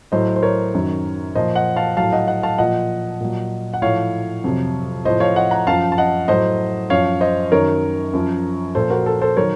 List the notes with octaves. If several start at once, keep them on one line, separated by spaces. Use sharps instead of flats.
A2 F#3 C5 D#5
C5
A#4 C#5
F#2 D#3 F#3
A#2 F3 C5 D#5
D#5 F#5
F5 A5
A2 F#3 F5 A5
D#5 F#5
D#5 F#5
F5 A5
A#2 F3 D#5 F#5
A#2 F#3
F#5
A2 F3 C#5 F5
F2 C3 F#3
A2 F3 C5 D#5
C#5 F5
D#5 F#5
F#5 A#5
F#2 F3 F5 A5
A5
D#5 F#5
A2 F#3 C5 D#5
F#2 F3 C#5 F5
C5 D#5
F#2 D#3 F#3 A#4 C#5
F#2 F3
A#2 F3 A4 C5
F#4 A#4
A4
A4 C5
D#3 F#3 A#4 C#5